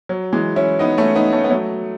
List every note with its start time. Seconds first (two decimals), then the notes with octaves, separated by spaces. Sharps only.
0.09 F#3
0.33 E3 G#3
0.56 C#4 E4
0.79 B3 D#4
0.98 A3 C#4
1.16 B3 D#4
1.33 A3 C#4
1.44 B3
1.50 F#3 A3